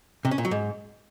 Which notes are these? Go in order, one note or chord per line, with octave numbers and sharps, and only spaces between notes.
C3
C#4
A#2
F#3
G#2